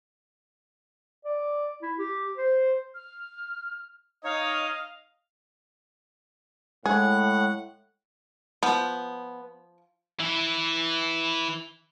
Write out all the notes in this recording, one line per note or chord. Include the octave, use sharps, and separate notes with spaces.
D5
E4
G4
C5
F6
D#4 C#5 D#5 F5
A2 G#3 G#4 F#5
F3 B3
E3 E4